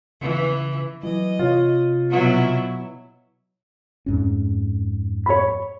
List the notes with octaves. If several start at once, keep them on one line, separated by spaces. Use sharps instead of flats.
C#3 E3
E3 F#3 D#5
C3 F4 C#5
B2 F#3 E4
F2 G#2 C#4
C#5 B5